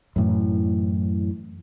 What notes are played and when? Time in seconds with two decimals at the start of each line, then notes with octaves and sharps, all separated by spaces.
0.16 F#2 A2 E3